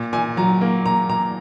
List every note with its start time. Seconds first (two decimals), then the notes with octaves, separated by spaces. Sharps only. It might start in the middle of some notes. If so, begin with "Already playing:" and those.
Already playing: A#2
0.13 A#2 G#5
0.37 F#3 A#5
0.61 A#3
0.86 A#2 A#5
1.09 A#2 A#5